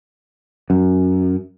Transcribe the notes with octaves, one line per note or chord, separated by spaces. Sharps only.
F#2